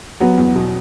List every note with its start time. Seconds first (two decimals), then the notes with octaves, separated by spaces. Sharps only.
0.20 F#3 B3
0.38 E2
0.56 B2